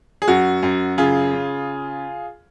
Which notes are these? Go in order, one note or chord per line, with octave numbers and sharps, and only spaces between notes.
G#4
F#2 F#4
F#2
C#3 F4 G#4
C#3